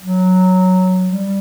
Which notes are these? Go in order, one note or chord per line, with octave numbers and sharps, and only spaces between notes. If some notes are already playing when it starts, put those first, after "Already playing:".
F#3
G3